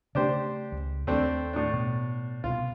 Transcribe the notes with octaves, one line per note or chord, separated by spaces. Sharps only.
C#3 A3 D4 G4 C5
C#2
D#2 A3 C4 D4
A2 D4
B2
C2 B2 F4